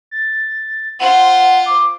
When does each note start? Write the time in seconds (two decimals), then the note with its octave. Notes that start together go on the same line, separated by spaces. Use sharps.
0.11 A6
1.00 F4 C5 F#5
1.66 D6